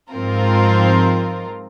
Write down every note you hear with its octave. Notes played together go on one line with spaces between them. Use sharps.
G#2 F3 C4 F4 A#4